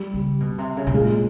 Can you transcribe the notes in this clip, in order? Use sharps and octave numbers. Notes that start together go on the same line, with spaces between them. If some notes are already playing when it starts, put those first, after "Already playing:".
Already playing: G3
C#3
B2
C3
C#3
B2
A#2 G#3